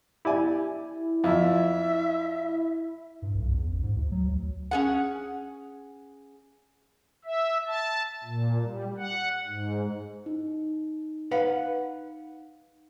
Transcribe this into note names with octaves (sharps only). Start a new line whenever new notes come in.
E4 G4 D5 G#5
F2 E5
G2
B1
E2
A1
G#2
D2
F#3
D2
C#4 G#4 F#5
E5
A5
A#2
G3
F#5
G#2
D#4
B4 F5 F#5